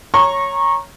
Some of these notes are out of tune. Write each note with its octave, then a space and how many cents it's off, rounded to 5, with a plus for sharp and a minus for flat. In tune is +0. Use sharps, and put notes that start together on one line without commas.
C#5 +0 A#5 +0 C#6 -20